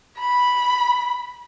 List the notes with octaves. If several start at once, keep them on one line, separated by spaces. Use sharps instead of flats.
B5